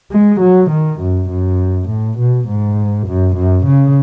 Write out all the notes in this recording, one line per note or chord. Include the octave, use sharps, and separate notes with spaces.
G#3
F#3
D#3
F#2
F#2
A2
B2
G#2
F#2
F#2
C#3